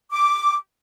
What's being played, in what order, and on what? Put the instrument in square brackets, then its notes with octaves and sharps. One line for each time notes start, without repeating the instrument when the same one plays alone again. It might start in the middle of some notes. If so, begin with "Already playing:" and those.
[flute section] D6